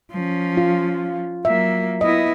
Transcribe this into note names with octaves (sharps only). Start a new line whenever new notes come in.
F3 C#4
F4
F#3 A#3 E5
B3 E4 D#5